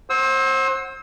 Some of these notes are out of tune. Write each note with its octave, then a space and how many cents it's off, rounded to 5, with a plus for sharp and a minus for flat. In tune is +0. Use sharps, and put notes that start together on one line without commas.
C5 +30 F#5 +0 E6 -25